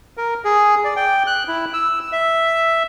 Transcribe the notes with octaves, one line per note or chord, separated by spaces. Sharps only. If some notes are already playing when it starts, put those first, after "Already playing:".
A#4
G#4
D5
G5
F#6
E4
E6
E5